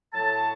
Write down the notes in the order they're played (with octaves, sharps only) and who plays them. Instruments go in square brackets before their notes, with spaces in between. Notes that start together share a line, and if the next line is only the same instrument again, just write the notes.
[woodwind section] A2 F#3 A3 A5